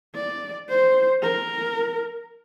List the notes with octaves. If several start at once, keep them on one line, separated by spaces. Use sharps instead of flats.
D5
C5
A#4